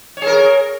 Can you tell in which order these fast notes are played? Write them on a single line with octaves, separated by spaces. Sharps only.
C#5 G#4 A#4